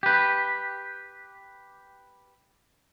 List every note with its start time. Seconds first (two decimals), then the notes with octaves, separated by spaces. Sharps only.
0.03 G4 B4